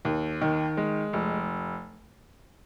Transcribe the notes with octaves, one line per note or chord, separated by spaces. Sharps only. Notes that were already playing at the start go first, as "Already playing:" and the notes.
D#2
D#3
G#3
F1